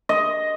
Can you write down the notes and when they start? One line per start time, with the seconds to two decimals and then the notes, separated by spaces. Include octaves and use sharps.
0.09 D#5